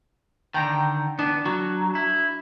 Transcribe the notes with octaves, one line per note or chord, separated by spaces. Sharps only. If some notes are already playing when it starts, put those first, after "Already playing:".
D3 D#3 G5 A#5
B3 D4
F#3 F#4
E4